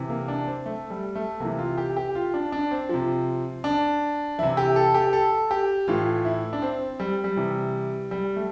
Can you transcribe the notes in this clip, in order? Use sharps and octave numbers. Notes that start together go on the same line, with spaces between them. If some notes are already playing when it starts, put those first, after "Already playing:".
Already playing: C3 E3
A#3
D4
C4
A3
G3
A3
C3 E3 A#3
F4
G4
G4
F4
D4
D4
C4
C3 F3
D4
C3 E3 E4
G4
A4
G4
A4
G4
A2 E3 F4
E4
D4
C4
G3
G3
C3 E3
G3
A3